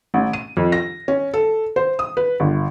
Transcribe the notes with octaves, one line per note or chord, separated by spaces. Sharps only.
A1
D#7
F2
A#6
C#4
A4
C5
D#6
B4
G1